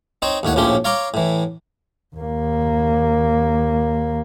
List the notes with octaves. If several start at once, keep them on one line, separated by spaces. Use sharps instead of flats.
C4 D#4 C5 C#5
D#2 A2 C#5 F#5
A#1 A2 F3 C#4 G4 C6
C#5 F5 A#5 C6 D6
A2 E3
D#2 A#3